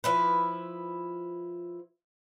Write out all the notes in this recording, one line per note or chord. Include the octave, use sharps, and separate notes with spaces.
F3 E4 B4